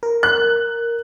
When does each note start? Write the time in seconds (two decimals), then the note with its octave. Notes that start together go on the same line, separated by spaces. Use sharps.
0.03 A#4
0.23 F#6